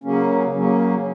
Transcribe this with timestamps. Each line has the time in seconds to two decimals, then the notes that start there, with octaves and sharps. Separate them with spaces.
0.04 C#3 F#3 A#3 C#4
0.54 C#3 F#3 A#3 C#4